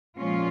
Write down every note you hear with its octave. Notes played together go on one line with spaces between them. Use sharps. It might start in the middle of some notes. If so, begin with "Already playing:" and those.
A#2 F3 G#3 C#4 F4